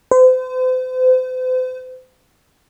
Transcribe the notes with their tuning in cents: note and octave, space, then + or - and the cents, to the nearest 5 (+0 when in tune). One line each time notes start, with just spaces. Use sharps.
C5 -40